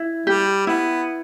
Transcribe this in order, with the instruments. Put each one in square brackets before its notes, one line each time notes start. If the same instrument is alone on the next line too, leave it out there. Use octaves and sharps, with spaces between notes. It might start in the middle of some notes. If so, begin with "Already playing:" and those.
Already playing: [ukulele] E4
[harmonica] G3 [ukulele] G4
[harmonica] B3 [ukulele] E4